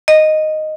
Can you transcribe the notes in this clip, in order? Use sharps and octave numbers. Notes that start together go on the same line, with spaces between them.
D#5